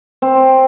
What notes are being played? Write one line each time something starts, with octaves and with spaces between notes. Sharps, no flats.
C4